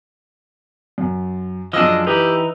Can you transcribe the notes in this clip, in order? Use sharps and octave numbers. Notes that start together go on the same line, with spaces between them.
F#2
F#2 F3 G#3 D4 D#5 E6
E3 D#4 G4 B4